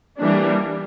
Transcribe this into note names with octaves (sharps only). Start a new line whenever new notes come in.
E3 G3 A#3 D4